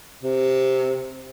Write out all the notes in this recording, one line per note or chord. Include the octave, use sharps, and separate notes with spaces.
C3